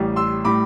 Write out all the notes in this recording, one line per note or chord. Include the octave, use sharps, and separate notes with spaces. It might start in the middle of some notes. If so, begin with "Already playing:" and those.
Already playing: A1 A2 G3
C6 E6
A2 G3 B5 D6